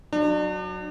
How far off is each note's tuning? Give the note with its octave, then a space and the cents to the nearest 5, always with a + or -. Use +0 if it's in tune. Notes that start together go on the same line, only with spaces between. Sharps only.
F#3 +0 D4 +40